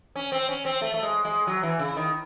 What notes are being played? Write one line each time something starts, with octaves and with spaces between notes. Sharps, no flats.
C#4
C4
C#4
C4
A3
A3
G#3
G#3
F#3
E3
C#3
D#3